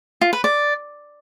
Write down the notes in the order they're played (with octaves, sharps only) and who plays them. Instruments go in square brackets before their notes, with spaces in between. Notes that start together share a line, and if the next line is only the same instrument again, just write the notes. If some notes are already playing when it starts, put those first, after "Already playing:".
[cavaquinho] F4
B4
D5